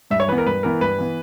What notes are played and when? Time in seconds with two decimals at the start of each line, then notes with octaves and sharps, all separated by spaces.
0.10 G2 E5
0.20 C#5
0.28 E3 B4
0.32 B3
0.38 A#4
0.46 G2 B4
0.63 E3 B3 A#4
0.81 G2 B4
0.98 E3 B3